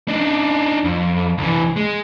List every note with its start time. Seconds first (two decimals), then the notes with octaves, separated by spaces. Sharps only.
0.08 D4 D#4
0.84 F2
1.38 C2 E3
1.76 G#3